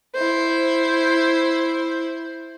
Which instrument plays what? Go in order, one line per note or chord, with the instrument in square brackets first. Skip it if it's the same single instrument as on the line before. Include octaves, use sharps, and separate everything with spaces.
[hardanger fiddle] E4 C5